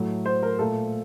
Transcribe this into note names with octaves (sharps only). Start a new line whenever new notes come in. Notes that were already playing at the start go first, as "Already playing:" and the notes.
Already playing: A2 F#3 A3
C5
A#4
A#2 A3 A4